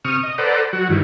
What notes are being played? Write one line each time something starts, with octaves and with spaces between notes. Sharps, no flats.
C3 C#6 D#6 F6
D#5
A4 B4 C5 D5 F#5 A#5
F#3 F#4
G2 D#3 E3